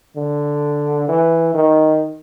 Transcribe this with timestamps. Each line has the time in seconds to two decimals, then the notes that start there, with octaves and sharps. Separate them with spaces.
0.16 D3
1.08 E3
1.54 D#3